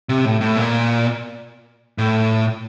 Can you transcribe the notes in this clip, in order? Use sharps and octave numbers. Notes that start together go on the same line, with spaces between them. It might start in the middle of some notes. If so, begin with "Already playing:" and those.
C3
A2
A2
A#2
A2